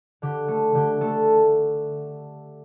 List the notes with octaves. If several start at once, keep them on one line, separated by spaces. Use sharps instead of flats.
D3 G4
A3
D3 G4
A3 A4